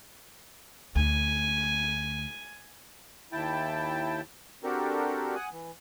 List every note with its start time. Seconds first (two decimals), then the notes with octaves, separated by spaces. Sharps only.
0.96 D2 G#5
3.32 D#2 E4 G5 A5
4.64 C4 D4 F#4 G4 A4 A#4
5.35 F#5 G#5 D#6
5.52 E3